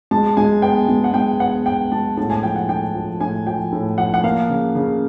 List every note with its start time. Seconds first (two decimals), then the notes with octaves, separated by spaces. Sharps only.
0.11 G#3 A5
0.37 G#3 G#5
0.62 B3 G5
0.89 G#3
1.04 F#5
1.14 G#3 G5
1.40 B3 F#5
1.66 B3 G5
1.92 G#3 A5
2.17 A2 A5
2.30 G#5
2.43 F3 G5
2.56 F#5
2.69 A2 G5
2.94 F3
3.20 A2 G#5
3.46 F3 G5
3.72 A2
3.98 F3 F#5
4.14 F#5
4.23 A#3 F5
4.50 C#3
4.75 C#3